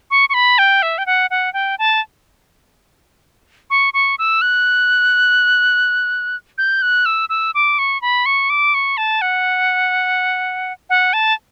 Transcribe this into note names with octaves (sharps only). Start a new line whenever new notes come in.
C#6
C#6
B5
G5
E5
G5
F#5
F#5
G5
A5
C#6
C#6
E6
F#6
G6
F#6
E6
E6
D6
C#6
B5
C#6
D6
C#6
A5
F#5
F#5
A5